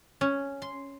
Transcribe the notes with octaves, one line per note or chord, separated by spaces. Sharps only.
C#4
C6